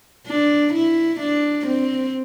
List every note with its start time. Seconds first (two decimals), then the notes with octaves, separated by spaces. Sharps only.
0.27 D4
0.73 E4
1.20 D4
1.67 C4